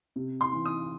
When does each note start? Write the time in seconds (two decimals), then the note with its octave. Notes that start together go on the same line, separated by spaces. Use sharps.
0.16 C3
0.41 C6
0.53 E3
0.66 D#6